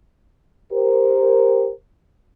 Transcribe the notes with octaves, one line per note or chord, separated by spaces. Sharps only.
G4 A#4 C5